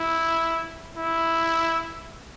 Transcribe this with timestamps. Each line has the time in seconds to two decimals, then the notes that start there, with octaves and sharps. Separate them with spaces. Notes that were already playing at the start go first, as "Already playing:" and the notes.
Already playing: E4
0.97 E4